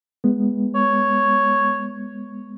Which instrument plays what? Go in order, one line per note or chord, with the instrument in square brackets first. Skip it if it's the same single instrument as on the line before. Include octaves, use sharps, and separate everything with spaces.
[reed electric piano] G#3 B3
[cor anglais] C#5